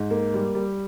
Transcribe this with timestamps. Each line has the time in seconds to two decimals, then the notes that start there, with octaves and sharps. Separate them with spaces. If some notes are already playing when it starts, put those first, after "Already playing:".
Already playing: G#2
0.11 A#3
0.34 G3
0.55 G3